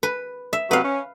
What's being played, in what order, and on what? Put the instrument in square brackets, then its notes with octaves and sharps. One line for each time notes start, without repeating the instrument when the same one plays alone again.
[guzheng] B4
E5
[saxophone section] C3 F#3 B3 [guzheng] B4 F5
[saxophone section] C#4